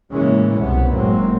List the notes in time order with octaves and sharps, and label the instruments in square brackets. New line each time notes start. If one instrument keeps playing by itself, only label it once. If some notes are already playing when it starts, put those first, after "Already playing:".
[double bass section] A2 C#3 E3 G#3 A#3 C#4
C2 F2 B2 B3
F#1 A2 F#3 G#3 A#3 C4